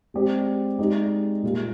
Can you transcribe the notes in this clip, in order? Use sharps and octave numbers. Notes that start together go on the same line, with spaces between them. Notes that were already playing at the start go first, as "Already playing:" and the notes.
G#3 C4 G4 D5
G#3 D#4 G4 D5
A#2 G3 A#3 F4